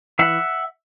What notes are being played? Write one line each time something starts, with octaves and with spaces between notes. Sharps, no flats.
E3 E5 F#5